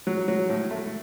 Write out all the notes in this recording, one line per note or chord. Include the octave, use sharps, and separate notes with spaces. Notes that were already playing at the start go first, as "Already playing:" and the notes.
F#3
F#3
A2
A3